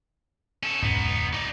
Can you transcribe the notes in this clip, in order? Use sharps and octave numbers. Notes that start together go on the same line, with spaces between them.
C#4 A4
E1 C#2 G#2 B3 D#4
D#4 D5